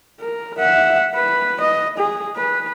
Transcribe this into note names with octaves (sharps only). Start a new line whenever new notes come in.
A#4
E5 F#5
B4
D#5
G#4
B4